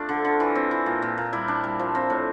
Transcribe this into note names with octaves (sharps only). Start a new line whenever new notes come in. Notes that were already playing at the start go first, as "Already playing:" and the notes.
Already playing: A3 C4 D4 F4
D3
D3
E3
C4
E3
A#2
A#2
A#2
G3 E4
D4
G3
F3
C4
A2